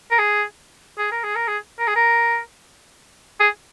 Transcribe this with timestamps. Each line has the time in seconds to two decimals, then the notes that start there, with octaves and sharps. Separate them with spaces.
0.11 A#4
0.19 G#4
0.98 G#4
1.11 A#4
1.24 G#4
1.36 A#4
1.48 G#4
1.79 A#4
1.87 G#4
1.96 A#4
3.40 G#4